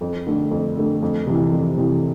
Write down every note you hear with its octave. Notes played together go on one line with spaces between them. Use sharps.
F2
D3 A3
F2
D3 A3
F2
C3 E3
F2
C3 E3